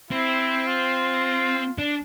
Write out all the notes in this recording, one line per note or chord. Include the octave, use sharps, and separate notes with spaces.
C4 E4
F4
D4